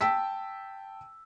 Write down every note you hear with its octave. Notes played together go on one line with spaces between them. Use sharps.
G5 A5 E6 B6